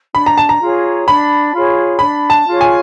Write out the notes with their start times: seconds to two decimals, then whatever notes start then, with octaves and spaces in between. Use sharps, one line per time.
0.14 D4 B5
0.26 A#5
0.38 A5
0.49 A#5
0.61 F4 G#4 C#5
1.07 D4 B5
1.53 F4 G#4 C#5
1.99 D4 B5
2.30 A5
2.45 F4 G#4 C#5
2.61 G#5